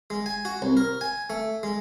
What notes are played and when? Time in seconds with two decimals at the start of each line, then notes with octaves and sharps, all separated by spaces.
0.10 G#3
0.26 G#5
0.45 F#4
0.62 C2
0.77 A#4
1.01 G#5
1.30 A3
1.63 G#3